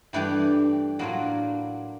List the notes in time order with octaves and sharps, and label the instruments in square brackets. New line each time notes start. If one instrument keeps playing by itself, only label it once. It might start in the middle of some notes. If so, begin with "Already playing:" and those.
[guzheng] G2 E3 A3 D4 G4
A2 F#3 A#3 D4 F4